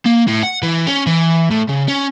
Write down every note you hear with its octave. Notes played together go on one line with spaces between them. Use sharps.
A#3
A2
F#5
E3
C#4
E3
A2
C#3
C#4